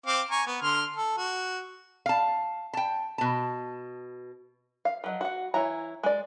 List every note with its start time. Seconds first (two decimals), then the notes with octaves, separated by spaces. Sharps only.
0.06 C4 F5 D6
0.31 G#5 A#5 C#6
0.46 B3
0.62 D3 C6 F6
0.96 A4
1.17 F#4
2.06 F5 A5
2.73 G5 A5
3.18 B2 A5
4.85 F5
5.04 F3 F#3 D#5
5.21 F#4 F#5
5.54 E3 E4 C#5 A#5
6.03 G#3 D5